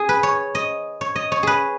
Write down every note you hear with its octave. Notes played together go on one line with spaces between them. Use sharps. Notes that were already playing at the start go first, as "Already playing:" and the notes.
Already playing: G#4
B4
C#5
D#5
C#5
D#5
C#5
G#4 B4